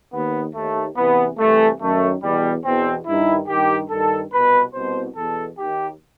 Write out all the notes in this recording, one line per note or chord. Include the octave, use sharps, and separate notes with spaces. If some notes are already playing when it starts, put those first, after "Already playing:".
D#2 D#3 B3
D#2 D#3 A3
E2 C3 E3 B3
C2 C3 E3 A3
F#2 D#3 A3
E2 B2 G3
E2 B2 C4
G2 D#3 E4
G2 D#3 G4
G2 D#3 A4
C2 B2 B4
C2 B2 C5
E2 B2 A4
D#2 D#3 G4